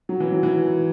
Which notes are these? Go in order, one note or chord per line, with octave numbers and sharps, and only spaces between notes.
F#3
E3
F#3
E3